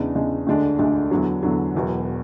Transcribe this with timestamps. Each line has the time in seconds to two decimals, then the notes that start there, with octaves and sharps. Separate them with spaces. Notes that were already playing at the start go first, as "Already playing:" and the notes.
Already playing: E2 C#3 G#3 D4
0.15 E2 C#3 G#3 D4
0.47 D2 D3 G#3 D4
0.79 D2 D3 G#3 D4
1.11 E2 D3 F#3
1.43 E2 D3 F#3
1.75 E1 E2 B2 F#3